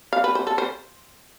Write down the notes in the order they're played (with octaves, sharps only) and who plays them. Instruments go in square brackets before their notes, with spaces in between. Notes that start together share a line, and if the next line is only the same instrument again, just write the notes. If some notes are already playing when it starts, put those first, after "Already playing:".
[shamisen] F5
B4
C5
A4
C5